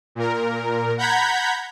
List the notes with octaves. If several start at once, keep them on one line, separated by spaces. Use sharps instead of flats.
A#2 A#4
F#5 A#5 B5 G6 G#6 B6